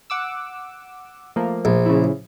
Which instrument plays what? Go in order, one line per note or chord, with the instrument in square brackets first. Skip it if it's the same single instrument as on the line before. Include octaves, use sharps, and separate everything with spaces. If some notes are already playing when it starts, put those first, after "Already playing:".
[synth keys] F#5 D6 E6
F3 A3 A#3
[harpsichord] A#1
[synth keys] C#3 E4